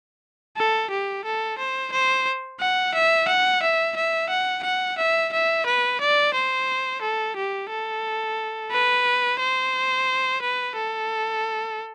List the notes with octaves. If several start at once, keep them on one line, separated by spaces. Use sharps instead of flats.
A4
G4
A4
C5
C5
F#5
E5
F#5
E5
E5
F#5
F#5
E5
E5
B4
D5
C5
A4
G4
A4
B4
C5
B4
A4